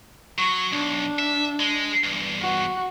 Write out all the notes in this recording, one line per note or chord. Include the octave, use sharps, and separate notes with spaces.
F#3 C#6
B1 D4
E5
G#3
E2 G2
F#4